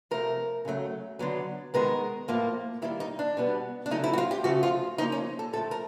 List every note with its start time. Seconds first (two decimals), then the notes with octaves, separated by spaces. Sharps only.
0.11 C3 F3 A3 A#4
0.65 C#3 F#3 A3
1.19 D3 F#3 B3
1.74 D#3 G#3 B3 A#4
2.28 A2 F3 A#3
2.82 D#3 G3 A#3 E4
3.00 D#4
3.19 D4
3.37 B2 G3 B3
3.86 D4
3.90 C#3 F#3 A3 D#4
4.04 E4
4.13 F#4
4.18 F4
4.31 G4
4.44 C#3 F3 A3 F#4
4.63 F4
4.98 C#3 F3 A#3 D#4
5.12 C#4
5.39 A4
5.53 A2 F3 A3 A4
5.71 A#4